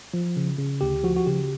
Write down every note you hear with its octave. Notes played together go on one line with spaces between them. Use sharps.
F3
C#3
C#3
D2 G4
F3 F#4
F#4
C#3 G4